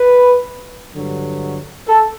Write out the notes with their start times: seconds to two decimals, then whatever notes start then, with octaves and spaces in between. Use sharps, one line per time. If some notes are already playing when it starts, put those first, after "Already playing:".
Already playing: B4
0.94 G2 D3 F#3
1.87 A4